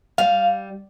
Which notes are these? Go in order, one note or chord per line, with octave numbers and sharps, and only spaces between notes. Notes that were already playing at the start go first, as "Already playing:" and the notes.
G3 F5